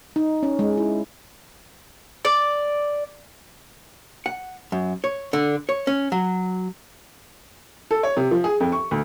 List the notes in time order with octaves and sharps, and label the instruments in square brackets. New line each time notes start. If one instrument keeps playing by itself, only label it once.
[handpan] D#4
C#4
G#3
E4
[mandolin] D5
[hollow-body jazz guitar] F#5
F#2
C#5
D3
C#5
C#4
F#3
[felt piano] A4
C#5
C3
F3
G#4
F2
C#6
D2